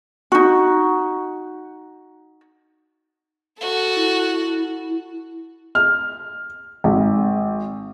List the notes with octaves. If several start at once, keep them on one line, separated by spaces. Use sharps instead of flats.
D#4 F#4
F#4 A4
E4
F6
G#1